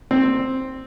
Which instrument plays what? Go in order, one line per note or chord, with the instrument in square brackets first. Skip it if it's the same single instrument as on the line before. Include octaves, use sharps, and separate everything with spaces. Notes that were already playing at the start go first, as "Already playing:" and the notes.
[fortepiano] C4